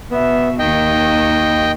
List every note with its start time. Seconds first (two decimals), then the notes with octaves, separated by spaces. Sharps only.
0.11 B2 B3 E5
0.59 D#2 D#3 D#5 G5